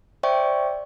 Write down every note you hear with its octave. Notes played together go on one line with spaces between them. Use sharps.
C5 D5 E5 G5 C#6